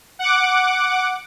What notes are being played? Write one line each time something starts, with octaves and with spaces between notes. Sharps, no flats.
F#5 D6